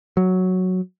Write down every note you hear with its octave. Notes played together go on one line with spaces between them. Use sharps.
F#3